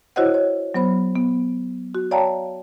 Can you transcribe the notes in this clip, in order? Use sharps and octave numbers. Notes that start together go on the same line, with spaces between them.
E4 F#4 C5 C#5 D#5 F#5
C#5
F#3 B3 C5 B5
B3
F#4
C#5 D5 F5 G5 A5 A#5